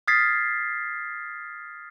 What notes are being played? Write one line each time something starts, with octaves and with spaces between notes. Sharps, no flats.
D#6 F6 G#6 A6 B6 C7